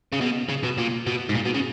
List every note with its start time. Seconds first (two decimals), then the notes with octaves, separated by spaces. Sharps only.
0.13 C#3
0.21 B2
0.49 C#3
0.64 B2
0.78 A#2
1.07 B2
1.29 G#2
1.35 A#2
1.45 B2
1.54 C#3